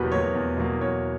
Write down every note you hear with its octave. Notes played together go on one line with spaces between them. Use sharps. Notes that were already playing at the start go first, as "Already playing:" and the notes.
Already playing: E2 B2 F#3 A#3 G4 B4
B2 F#3 A#3 C#5
E2
B2 F#3 A#3
E2 C#5